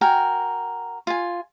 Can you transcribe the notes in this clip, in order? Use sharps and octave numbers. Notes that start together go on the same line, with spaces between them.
F#4 A#4 G5 G#5
F4 G#5